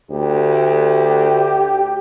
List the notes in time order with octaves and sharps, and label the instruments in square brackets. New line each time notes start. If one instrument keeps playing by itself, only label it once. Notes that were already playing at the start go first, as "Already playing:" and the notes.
[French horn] D2 [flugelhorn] G4